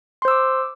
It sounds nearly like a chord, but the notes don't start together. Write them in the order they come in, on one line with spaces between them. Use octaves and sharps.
C6 C5 E6 D6